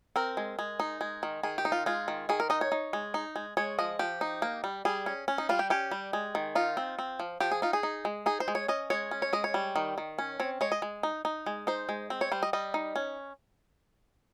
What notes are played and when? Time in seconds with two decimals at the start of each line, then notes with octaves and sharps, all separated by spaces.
0.16 C4 A#4
0.37 G#3
0.59 G#3
0.80 D#4
1.01 G#3
1.23 D#3
1.43 D#3 G#4
1.58 G4
1.65 D#4
1.72 F4
1.86 G#3 F4
2.08 D#3
2.29 D#3 G#4
2.40 A#4
2.50 D#4 D#5
2.61 C#5
2.72 D#4
2.93 G#3
3.14 D#4
3.36 G#3
3.57 G#3 C#5
3.79 F3 D#5
3.99 F3 G4
4.21 D#4
4.42 A#3
4.64 G3
4.85 G3 G#4
5.06 C#4
5.28 C#4
5.38 D#4
5.49 G3 F4
5.59 G4
5.70 C#4 G4
5.91 G3
6.13 G#3
6.35 D#3
6.55 D#4 F4
6.77 C4
6.99 C4
7.20 F3
7.40 F3 G4
7.51 G#4
7.62 D#4 F4
7.73 G#4
7.83 D#4
8.05 G#3
8.26 D#4 G#4
8.40 C5
8.48 G#3
8.55 C#5
8.68 C#4 D#5
8.90 G#3 C#5
9.11 C#4
9.22 C#5
9.33 G#3 D#5
9.44 C#5
9.54 G3
9.76 D#3
9.98 D#3
10.18 C#4
10.40 C4 C#5
10.61 G#3 C#5
10.72 D#5
10.82 G#3
11.03 D#4
11.25 D#4
11.46 G#3
11.67 D#4 C5
11.89 G#3
12.10 C4
12.21 C#5
12.32 G3 C5
12.43 D#5
12.53 G3 D#5
12.74 D#4
12.96 C#4